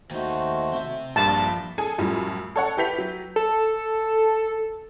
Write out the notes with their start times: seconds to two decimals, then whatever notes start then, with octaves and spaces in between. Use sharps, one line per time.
0.11 D#2 A3 D#4 F#4 C5
0.73 C4 E5
1.16 A#1 G2 F3 A#3 D4 A5
1.78 G#4 A4 G#5 A5
1.98 F#2 A2 F3 G3
2.56 A4 C#5 F#5
2.77 E4 G4 B4 G6 B6 F7
2.98 F#3
3.36 A4